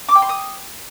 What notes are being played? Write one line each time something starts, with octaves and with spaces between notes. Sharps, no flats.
D6
G5
C6
D#6